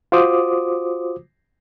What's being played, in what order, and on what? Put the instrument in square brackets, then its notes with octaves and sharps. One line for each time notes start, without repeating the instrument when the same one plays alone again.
[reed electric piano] F4 F#4 C5 D6 D#6